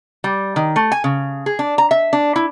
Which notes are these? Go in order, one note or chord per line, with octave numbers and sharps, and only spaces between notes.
G3
D#3
A3
G#5
C#3
G#4
D4
A#5
E5
D4
E4